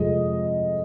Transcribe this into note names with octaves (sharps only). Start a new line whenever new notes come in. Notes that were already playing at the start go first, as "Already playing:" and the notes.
Already playing: F2 C3 F3 G#3 D#5